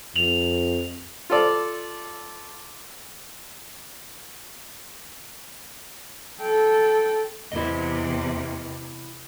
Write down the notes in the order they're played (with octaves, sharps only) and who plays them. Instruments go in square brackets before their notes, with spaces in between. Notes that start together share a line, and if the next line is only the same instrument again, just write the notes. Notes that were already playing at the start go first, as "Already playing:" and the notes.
[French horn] F2 [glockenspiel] F7 F#7
[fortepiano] F4 A4 D5
[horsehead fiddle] A4 G5
[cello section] E2 C3 [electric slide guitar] E4 D#5